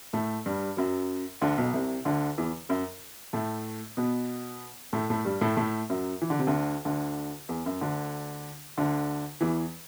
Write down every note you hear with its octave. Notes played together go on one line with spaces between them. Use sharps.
A2 A3
G2 G3
F#2 F#3
D2 D3
B1 B2
C2 C3
D2 D3
E2 E3
F#2 F#3
A2 A3
B2 B3
A2 A3
A2 A3
G2 G3
A2 A3
A2 A3
F#2 F#3
E3
D3
C3
D2 D3
D2 D3
E2
F#2
D2 D3
D2 D3
E2 E3